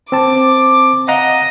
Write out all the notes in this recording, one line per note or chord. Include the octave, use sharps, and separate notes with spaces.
C4 A5 D6
D#5 F5 F#5 A#5